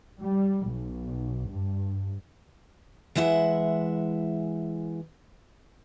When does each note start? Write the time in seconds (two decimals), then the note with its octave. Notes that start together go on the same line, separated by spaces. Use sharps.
0.21 G3
0.66 B1
1.48 G2
3.15 E3 G#3 E4 E5 F#5